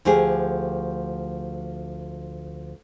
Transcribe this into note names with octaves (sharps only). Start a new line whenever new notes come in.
D2 F3 G4 G#4